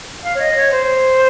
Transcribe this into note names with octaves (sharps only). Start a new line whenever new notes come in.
F5
C#5
D#5
C#5
C5